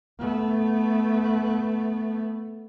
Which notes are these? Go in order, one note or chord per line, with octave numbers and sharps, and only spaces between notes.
A3 B3